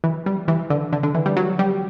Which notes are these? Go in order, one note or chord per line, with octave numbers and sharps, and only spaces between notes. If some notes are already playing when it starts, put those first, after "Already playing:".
E3
G3
E3
D3
D3
D3
E3
G3
F#3
G3